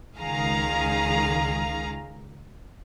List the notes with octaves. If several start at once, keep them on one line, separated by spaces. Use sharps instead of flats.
C#2 D#3 G#4 F5 A#5